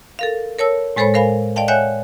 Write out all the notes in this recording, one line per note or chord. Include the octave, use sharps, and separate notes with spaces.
A4 A#4 F5
A#4 C#5 A5 E6
A2 G#3 A4 C5 C#5 B5
A#4 C5 F5 G#5 B5
D5 D#5 F5 G5 A5
C#5 E5 F#5 G#5 F#6 G6